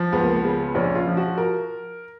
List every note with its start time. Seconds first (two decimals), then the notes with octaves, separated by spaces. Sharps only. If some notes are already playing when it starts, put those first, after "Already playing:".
Already playing: F3
0.12 C#2 B3
0.24 A#3
0.36 B3
0.44 C#3
0.75 A#1 C#4
0.95 F4
1.07 F3
1.17 F#4
1.38 A#4